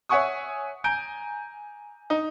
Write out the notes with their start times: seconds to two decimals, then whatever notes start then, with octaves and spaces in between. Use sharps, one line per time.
0.09 C#5 E5 F#5 G#5 C#6 D#6
0.84 G#5 A#5 G6 D7
2.10 D#4